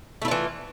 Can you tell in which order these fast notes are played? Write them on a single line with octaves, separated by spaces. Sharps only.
A3 E4 F4 E3